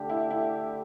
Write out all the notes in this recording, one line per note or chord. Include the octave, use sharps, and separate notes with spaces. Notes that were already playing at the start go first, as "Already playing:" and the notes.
Already playing: D3 A3 D4 G4
E4
E4